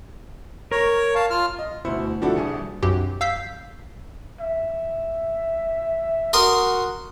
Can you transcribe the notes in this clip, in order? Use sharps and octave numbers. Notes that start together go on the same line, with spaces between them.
A#4 C#5
F5 A5
F4 F6
D#5
D2 B2 E4 C5 C#7
D3 F3 D4 E4 F#4 A4
D#1 C2 G#4 G#5 C#7
B1 F#2 G4
F5 E6 G6 B6 C7
E5
F#4 A#4 C6 D#6